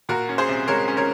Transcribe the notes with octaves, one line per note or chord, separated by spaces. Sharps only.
A#2 F#4 A#4
C#4
G#4 C5
C2
G#3 A#4 C#5
C#4
A#4 C#5